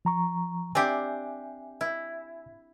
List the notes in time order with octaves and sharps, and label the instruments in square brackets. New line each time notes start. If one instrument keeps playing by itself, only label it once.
[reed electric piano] F3 A#5 C#6
[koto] C4 D4 G4 [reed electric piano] E5 G#5
[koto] E4